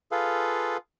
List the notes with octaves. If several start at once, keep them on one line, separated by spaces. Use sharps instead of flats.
F4 G#4 A4 B4 F5